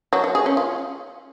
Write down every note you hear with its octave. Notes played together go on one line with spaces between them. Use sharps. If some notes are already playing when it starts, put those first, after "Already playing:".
F#3
F#3
G#4
C#4
F4